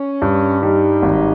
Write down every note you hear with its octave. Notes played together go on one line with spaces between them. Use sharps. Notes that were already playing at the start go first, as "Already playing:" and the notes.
Already playing: C#4
G2
G3 D#4
G#1